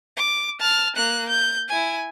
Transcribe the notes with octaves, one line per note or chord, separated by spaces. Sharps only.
D6
A5 F6
A#3 F#6
G6
E4 G#5